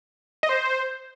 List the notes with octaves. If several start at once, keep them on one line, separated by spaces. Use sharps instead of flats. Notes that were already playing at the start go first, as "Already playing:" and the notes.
D#5
C5